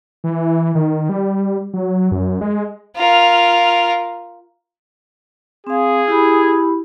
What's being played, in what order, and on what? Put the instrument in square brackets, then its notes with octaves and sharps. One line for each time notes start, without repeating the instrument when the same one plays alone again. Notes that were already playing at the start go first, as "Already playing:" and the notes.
[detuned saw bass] E3
D#3
G3
F#3
F#2
G#3
[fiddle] F4 A#4
[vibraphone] C4 F5 [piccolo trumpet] G#4
[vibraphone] E4 G4 B5